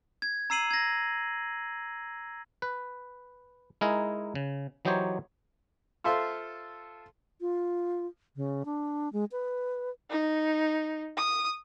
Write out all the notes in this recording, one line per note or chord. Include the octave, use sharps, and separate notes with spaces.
G#6
A#5 E6 C7 D#7 F#7
G#6 A#6
B4
G#3 D#4 E4 A#4 G#5
C#3
E3 F#3 D#4 G4 C5 C#5
F4 A4 C5 E5 F5 C6
F4
C#3
D4
G#3
B4
D#4
D#6